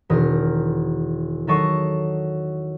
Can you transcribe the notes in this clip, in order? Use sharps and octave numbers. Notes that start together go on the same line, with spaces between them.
E1 D#3 A#4 D#6 F6
D#3 F#3 A4 D#5 C#6 C7